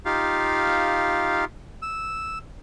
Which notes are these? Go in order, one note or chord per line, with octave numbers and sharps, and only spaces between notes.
D#4 F4 G4 F5
E6